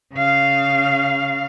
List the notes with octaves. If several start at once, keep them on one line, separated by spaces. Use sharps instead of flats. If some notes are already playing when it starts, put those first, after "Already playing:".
C#3 F5